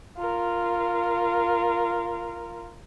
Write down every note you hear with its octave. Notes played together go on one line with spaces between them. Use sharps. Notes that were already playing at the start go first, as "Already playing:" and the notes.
F4 A#4